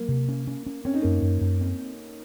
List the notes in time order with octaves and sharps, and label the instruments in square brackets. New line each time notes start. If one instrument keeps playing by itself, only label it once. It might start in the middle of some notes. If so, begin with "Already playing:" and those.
Already playing: [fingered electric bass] F#3 [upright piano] A#3
[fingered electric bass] C3
C#4
C#4
C#4
[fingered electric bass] C4 [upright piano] C#4
[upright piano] D#4
[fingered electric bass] F#2 [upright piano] A#3 C#4
[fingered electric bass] F#2
F#2
C4